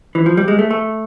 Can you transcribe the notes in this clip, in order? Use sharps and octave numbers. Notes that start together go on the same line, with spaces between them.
E3
F3
G3
G#3
A3
A3